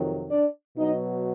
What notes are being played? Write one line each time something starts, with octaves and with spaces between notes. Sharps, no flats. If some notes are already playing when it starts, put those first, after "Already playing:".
Already playing: F2 C3 D#3 F#3
D4 D5
B2 F#3 D#4 D#5